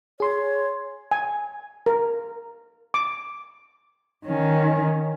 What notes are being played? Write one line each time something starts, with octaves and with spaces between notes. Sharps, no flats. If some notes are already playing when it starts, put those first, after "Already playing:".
G#4 C#5 C6
G#5
A#4
D6
D#3 C#4